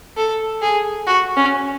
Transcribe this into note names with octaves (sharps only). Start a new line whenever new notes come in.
A4
G#4
F#4
C#4